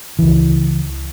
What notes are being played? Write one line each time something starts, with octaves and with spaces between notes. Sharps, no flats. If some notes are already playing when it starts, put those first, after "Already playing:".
C#2 E3